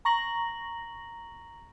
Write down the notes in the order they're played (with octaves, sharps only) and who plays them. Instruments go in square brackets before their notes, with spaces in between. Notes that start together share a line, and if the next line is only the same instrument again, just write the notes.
[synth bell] A#5 C#6 A#6 F#7